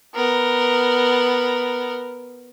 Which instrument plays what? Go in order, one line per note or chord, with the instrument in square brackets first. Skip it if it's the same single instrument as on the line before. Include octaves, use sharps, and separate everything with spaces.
[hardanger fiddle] B3 A#4